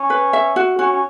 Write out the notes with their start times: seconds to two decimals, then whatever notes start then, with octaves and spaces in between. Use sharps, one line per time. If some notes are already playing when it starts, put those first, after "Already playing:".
Already playing: C#4
0.10 B4
0.33 E5
0.56 F#4
0.78 C#4 F#4
0.92 C#4